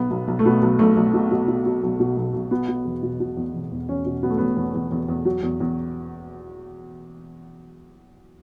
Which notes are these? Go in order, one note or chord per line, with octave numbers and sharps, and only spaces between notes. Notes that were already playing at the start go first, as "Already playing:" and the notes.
Already playing: B1 F#3 B3
B1
B1
A3
B2 B3
B1
B1 A3
B1
B2
F#3
B2
F#3
B1
B2
B1
B1
B2 B3
B2
E1
B2
B2
E2
E1
E2
E1 C#4
B2
F#3 B3
A3
E1 B3
E2 B3
E2
E2
E2
F#3
E2
E2